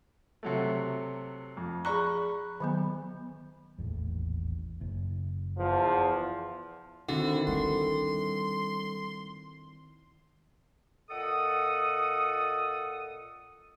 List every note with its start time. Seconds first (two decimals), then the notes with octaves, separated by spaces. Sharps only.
0.43 C3 F#3 A3
1.57 F2
1.85 G#4 D5 A#5 B5 C#6 F#6
2.60 D#3 F#3 B3
3.78 D#1 A1 E2
4.81 F#1
5.58 E2 F3
7.08 D3 D#3 C4 E4 F#4
7.47 G3 C6
11.10 A#2 A4 D#5 F#5 D#6